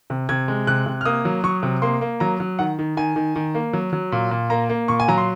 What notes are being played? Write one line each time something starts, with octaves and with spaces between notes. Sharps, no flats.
C3
C3 G#6
G#3
C3 F#6
C3
F6
A#3 D#6
F#3
F#3 C#6
C3
A#3 C6
A#3
F#3 A#5
F#3
D#3 F#5
D#3
D#3 G#5
D#3
D#3
A#3
F#3
F#3
A#2
A#2
A#3 A#5
A#3
A#2 C#6
G#5
F#3 A#5
C6